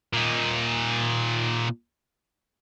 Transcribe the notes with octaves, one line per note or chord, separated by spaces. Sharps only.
A#2 D#4